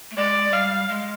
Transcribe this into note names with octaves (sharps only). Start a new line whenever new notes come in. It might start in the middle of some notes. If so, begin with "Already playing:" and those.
A3
G#3 D5
G3 F5
G#3